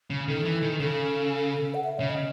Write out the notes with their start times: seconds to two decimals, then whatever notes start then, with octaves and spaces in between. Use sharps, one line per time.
0.10 C#3
0.28 D#3 A4
0.45 E3
0.62 D#3
0.80 C#3 A4
1.74 F#5
1.84 E5
1.98 C#3 C#5
2.10 D#5